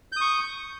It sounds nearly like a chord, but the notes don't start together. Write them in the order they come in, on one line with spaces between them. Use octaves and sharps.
G6 D#6 C#6